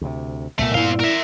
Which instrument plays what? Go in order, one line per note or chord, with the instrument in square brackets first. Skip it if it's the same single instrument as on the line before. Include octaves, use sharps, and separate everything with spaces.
[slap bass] D2 C3
[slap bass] C2 A#2 B3 [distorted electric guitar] A3 [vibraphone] A#4
[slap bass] G2 A#2 B3 [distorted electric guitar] C4 F5 [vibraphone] E4 D5
[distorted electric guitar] A#4 E5